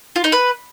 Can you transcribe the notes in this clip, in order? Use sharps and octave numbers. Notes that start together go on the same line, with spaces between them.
F4
D#4
B4